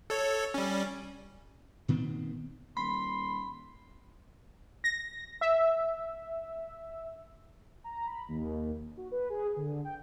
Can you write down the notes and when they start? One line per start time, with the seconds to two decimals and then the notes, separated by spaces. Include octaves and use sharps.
0.10 A4 C#5
0.54 G3 C#4
1.88 A#2 D#3 B3 C4
2.77 D#1 B5 C6
4.84 A#6
5.41 E5
7.84 A#5
8.06 B5
8.28 D#2
8.97 F#4
9.11 B4
9.30 G#4
9.56 D3
9.85 G5